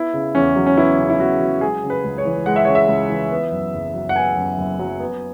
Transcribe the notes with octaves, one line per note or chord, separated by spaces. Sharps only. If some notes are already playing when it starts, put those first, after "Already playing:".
Already playing: B3 E4
C#3
E2 C#4
F#3
C#4
B3 E4
C#3
E4
E2 F#4
F#3
G#3 G#4
C#3
B4
C#2
C#5
E3
G#3 F#5
E5
C#3 C#5
E5
C#2
E3
B3
F#2
F#1
F#3
F#5
B3 G#5
F#2
F#1
F#3
B3